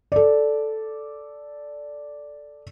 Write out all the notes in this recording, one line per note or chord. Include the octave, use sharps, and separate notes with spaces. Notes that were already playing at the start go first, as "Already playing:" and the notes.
A4 D5